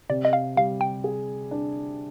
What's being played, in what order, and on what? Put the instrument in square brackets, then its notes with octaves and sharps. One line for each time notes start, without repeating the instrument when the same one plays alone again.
[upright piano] C3 [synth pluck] D5
[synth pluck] D#5
F5
[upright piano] G3 [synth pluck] F5
[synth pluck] G5
[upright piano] G#4
D4